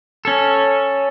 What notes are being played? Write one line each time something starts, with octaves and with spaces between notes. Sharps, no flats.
C#4 A4